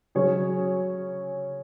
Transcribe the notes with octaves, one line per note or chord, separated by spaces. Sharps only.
C#3 F#3 C#4 G#4 C#5